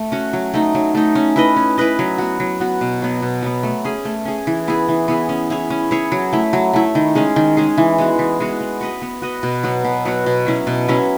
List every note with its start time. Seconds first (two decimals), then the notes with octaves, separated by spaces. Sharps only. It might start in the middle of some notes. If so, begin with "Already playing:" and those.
Already playing: A3
0.12 C#4 F#4
0.33 F#3
0.54 A3 D#4
0.75 F#3
0.95 A3 D#4
1.15 C#4
1.36 E4 B4 D#5
1.56 C#4
1.78 E4 B4 D#5
1.99 F#3
2.18 B3 F#4
2.40 F#3
2.60 B3 F#4
2.81 B2
3.02 F#3 B3
3.22 B2
3.42 F#3 B3
3.63 A3
3.85 C#4 G#4
4.05 A3
4.25 C#4 G#4
4.47 E3
4.68 B3 E4 G#4
4.88 E3
5.08 B3 E4 G#4
5.29 C#4
5.50 E4 G#4 C#5
5.70 C#4
5.91 E4 G#4 C#5
6.12 F#3
6.33 A3 E4
6.53 F#3
6.73 A3 E4
6.95 D#3
7.15 G#3 C#4 G#4
7.36 D#3
7.57 G#3 C#4 G#4
7.78 E3
7.98 G#3 B3 F#4
8.19 E3
8.40 G#3 B3 F#4
8.60 B3
8.81 F#4 B4 D#5
9.02 B3
9.22 F#4 B4 D#5
9.43 B2
9.63 F#3 B3 F#4
9.85 B2
10.05 F#3 B3 F#4
10.26 B2
10.46 F#3 C#4 E4
10.67 B2
10.88 F#3 C#4 E4